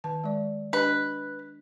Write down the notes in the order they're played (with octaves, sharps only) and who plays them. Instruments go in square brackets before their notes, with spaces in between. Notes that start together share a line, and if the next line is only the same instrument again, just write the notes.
[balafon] D#3 B4 A5
G#3 D5
[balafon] D4 G4 D#5 [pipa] B4